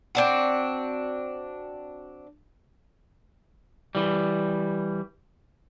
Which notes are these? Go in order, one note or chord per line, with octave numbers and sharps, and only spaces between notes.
C4 D4 F#4
E3 G3